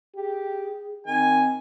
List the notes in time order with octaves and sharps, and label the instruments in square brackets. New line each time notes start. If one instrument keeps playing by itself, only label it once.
[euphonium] G4 [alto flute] G#4
[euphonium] D#3 [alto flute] C4 [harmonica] G#5